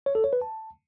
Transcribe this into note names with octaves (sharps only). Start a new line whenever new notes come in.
C#5
A4
C#5
B4
A5